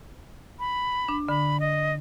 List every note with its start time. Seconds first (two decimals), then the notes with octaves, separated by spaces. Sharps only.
0.59 B5
1.08 D4
1.29 D3 B5
1.60 D#5